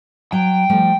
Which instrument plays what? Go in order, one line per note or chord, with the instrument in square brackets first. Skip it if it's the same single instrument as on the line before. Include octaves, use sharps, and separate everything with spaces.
[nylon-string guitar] F#3 [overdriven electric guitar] G5
[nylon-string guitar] F3 G3 A3